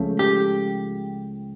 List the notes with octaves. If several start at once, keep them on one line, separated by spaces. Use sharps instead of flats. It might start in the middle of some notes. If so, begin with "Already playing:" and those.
Already playing: C#2 C#3 F3 A3
G4